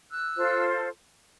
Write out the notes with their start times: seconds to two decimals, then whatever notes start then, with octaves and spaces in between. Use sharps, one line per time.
0.10 E6 F#6
0.36 F4 A4 C5